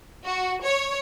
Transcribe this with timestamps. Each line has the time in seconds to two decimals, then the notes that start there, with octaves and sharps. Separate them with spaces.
0.25 F#4
0.64 C#5